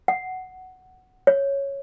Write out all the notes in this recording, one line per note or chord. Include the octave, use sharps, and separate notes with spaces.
F#5
C#5